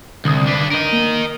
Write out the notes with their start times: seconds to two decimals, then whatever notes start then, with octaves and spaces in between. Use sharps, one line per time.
0.25 C2 D3 D#6
0.47 D4 B4
0.72 A#4 D#5
0.93 A#3